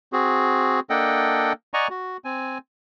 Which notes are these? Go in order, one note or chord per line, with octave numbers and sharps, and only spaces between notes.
C4 F#4 G#4
A#3 D4 A4 D#5 F#5 G5
D5 D#5 F#5 G#5 A#5 C#6
F#4
C4 G#5